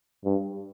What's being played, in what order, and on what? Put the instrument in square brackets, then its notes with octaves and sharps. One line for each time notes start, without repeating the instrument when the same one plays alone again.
[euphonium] G2